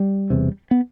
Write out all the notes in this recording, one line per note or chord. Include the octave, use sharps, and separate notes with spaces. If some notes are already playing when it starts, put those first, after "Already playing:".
Already playing: G3
E1 E2 C3
B3